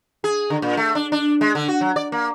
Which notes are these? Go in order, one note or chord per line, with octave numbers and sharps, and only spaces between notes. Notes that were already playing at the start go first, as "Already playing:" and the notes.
G#4
D3
A#2
A3
D4
D4
G#3
D3
F#4
F#3
D5
A#3